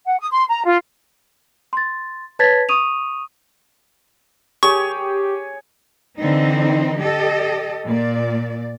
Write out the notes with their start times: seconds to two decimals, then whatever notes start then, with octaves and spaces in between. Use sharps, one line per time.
0.06 F#5
0.19 D#6
0.31 C6
0.48 A#5
0.66 F4
1.73 C6 A6
2.39 B4 C#5 A5 G#6 A6 B6
2.69 C#6 D#6 D#7 F7
4.63 G4 G#4 C#5 C#6
6.19 D3 E3 C4 D#4
6.98 G4 A4 D#5
7.85 A#2 D5